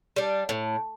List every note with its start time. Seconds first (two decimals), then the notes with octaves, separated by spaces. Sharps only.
0.16 G3 D4
0.49 A2